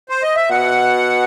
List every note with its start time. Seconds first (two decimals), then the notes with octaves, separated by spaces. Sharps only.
0.09 C5
0.22 D#5
0.36 E5
0.50 B2 F#5